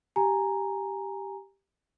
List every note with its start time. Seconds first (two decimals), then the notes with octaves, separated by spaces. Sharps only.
0.16 G4 G#5 A#5